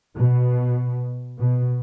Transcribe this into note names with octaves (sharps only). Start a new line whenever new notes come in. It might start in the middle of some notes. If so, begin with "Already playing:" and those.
B2
B2